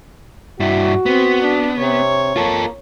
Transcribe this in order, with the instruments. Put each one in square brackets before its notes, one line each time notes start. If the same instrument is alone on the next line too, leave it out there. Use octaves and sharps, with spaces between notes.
[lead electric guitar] G2 E4 [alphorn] F#4
[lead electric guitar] B3 [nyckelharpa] C4
[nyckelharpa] D4
[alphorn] C3 [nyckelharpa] C#5
[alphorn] A#3 [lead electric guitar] F4 A4